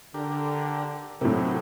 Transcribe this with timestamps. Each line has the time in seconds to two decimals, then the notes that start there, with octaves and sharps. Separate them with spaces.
0.14 D3 D4 G4 A#4
1.21 A2 C3 F#3 E4 G4 A#4